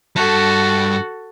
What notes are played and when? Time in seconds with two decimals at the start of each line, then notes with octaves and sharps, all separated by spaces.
0.16 G2 F#4 A4 A5